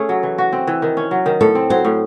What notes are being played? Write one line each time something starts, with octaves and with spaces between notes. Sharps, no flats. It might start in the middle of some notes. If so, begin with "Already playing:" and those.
Already playing: A3 C#4 G#4
F#3
E3
F#4
C4
E3
D#3
C#4
F#3
D#3
A2 A4
C4
F#3 C5
A2